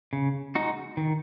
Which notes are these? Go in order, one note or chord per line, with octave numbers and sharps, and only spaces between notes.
C#3
G#3 D#4 F#4
D#3